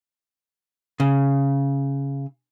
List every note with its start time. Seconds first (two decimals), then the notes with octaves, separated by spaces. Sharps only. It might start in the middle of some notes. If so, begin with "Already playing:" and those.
1.00 C#3